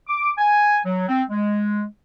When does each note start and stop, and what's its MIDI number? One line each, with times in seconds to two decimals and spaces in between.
0.08 0.31 86
0.38 0.78 80
0.85 1.07 54
1.09 1.23 60
1.30 1.84 56